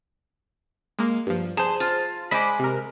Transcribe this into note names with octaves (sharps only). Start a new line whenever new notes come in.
G#3 A#3
G2 F3
G#4 C5 A5
F4
G#3 C5 G#5 B5 D6
C3 A#4